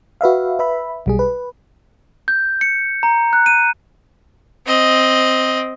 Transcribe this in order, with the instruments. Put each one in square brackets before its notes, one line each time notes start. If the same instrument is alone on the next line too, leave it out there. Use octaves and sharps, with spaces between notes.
[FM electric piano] F#4 B4 E5 F5
B4 E5 B5
B1 G3 G#4
B4
[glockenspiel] G6
C#7
A#5
F#6
D#7
[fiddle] C4 D#5